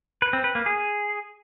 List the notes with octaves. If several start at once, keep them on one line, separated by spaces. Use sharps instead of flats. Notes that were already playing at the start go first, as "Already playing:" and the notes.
B4
C4
B4
A#3
G#4